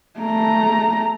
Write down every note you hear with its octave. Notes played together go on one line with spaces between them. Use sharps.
A3 A#5